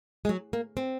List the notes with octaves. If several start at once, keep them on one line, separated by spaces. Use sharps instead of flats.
G#3
F#3
A#3
C4